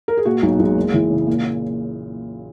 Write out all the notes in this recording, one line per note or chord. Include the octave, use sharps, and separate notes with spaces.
A#4
G#4
A#2 F#4
B1 D#4
B1 G#3
F#1
E3
C#3
A#2